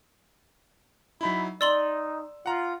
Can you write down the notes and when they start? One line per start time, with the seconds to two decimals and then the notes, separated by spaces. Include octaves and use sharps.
1.21 F#3 D#4 E4 B5
1.61 D#4 D5 C6 E6 F#7
2.46 F4 F#5 A#5